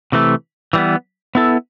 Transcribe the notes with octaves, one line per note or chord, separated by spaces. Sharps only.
C3 E3 A3
E3 G3 B3
B3 E4 A4